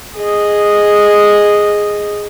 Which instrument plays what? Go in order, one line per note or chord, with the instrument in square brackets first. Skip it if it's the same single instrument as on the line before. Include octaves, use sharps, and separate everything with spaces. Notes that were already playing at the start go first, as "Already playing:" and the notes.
[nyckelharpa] G#4 D#5